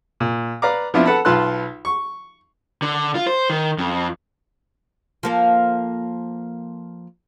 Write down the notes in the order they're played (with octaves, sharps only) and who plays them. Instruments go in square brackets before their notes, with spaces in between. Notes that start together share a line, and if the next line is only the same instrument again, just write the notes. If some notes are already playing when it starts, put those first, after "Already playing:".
[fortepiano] A#2
B4 D5 F5 A#5 D6
F3 B3 C4 D4 E4 F4
A4 B4 F#5 A5 B5
B1 F4 B4 A5 C6 F#6
C#6
[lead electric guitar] D3
F4
C5
D#3
F2
[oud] F3 A#3 A4